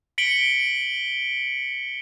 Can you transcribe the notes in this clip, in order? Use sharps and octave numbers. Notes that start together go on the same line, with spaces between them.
B6 C#7 D7 F#7 G7